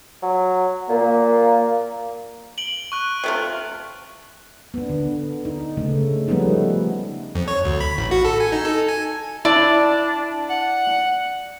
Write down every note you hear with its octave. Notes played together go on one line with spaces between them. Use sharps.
F#3
A#2 A#3
D7 F#7 G7
C#6 F#6 F#7
C3 A3 F4
B3 D4
D3
D#4
C#3 A3
F3 G3 A3 B3 C#4 D#4
F2
C#5
D2
B5
A1
F#4
A4
G#5
D#4
A4
G#5
D4 E4 D5
F#5